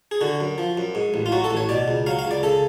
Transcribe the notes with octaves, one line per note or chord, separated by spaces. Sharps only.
G#4
D3 F#4
F#2
F3
F#2
G#2
A1
F4
F#3 F#4
A4
A1
C#5
B2 D5
C#2
F#3 F5
F5
C#2
D5
C#3 A4